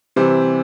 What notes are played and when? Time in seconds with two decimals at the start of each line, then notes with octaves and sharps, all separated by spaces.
0.16 C3 E3 G3 C5